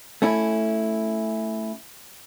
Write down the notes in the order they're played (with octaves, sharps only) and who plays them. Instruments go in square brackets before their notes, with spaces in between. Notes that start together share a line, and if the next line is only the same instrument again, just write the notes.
[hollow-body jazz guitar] A3 C#4 E4